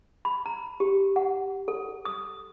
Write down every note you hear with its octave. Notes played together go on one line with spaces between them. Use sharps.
B5
A#5
G4
F#5
A4
D#6